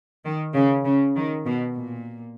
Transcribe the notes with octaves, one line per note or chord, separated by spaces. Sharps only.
D#3
C#3
C#3
D#3
B2
A#2